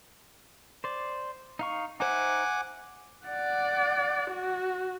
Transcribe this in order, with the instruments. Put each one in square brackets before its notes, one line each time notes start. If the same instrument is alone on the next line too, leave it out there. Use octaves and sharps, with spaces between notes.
[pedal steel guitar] C5 D5
D#4 F5 C#6
[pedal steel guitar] D#4 C5 E5 [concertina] F#5 G#5 D6
[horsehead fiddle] D5 F#5
F#4